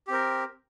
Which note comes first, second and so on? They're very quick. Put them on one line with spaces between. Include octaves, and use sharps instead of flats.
G4 C4 A#4